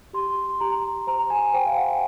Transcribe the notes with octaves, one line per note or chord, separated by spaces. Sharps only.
G4 C6
G4 A#5
C5 A#5
G#5
C5 G5
F5
F#5